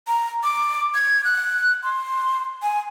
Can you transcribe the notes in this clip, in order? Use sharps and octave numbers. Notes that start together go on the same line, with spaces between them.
A#5
D6
G#6
F#6
C6
G#5